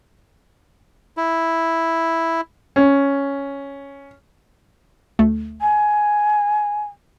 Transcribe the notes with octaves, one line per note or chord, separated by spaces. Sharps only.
E4
C#4
D2 A3
G#5